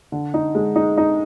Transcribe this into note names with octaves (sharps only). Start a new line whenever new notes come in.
D3
D#4
G#3
D#4
D#4